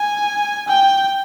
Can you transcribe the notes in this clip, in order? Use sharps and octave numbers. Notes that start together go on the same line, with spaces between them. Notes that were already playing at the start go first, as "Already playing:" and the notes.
Already playing: G#5
G5